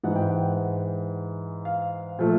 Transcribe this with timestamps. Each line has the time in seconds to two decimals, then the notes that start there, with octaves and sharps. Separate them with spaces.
0.04 G#2 E3 G#3 F#5
0.16 G5
0.29 F#5
1.65 F5
2.19 A#2 F3 A3